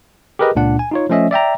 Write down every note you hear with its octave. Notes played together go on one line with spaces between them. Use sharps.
G4 G#4 A#4 B4 D#5
C#2 A#2 D4 F#5
G#5
D#4 F4 C#5
F3 A3 C#4 D#5 E5
D5 E5 G5 A#5